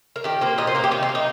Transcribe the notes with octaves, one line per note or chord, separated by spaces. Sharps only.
A#4
D#3 G4
A#3 C5
A#2 D#5
C5
A#3 A#4
G4
D#3 D#4
C4
A#3
D#4